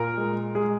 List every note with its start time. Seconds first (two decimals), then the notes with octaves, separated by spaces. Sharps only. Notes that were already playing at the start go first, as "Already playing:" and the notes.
Already playing: A#2 A#4
0.17 G#3
0.55 G#3 G#4